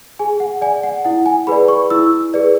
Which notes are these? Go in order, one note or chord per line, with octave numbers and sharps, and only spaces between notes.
G#4 G#5
F#5
D5 G#5
F#5
E4 F#5
G#5
G#4 B4 D5 B5
C#6
E4 E6
G#4 B4 D5